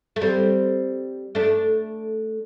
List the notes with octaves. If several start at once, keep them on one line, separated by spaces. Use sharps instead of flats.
A3
G3 C4
A3 D4